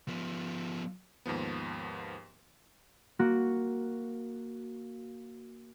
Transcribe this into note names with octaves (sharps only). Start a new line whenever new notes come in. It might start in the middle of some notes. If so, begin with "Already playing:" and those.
F3 B3
D#2 G#2 F3 B3
A#3 F#4